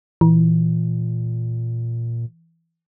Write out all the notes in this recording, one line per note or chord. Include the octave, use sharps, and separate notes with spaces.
A#2 E3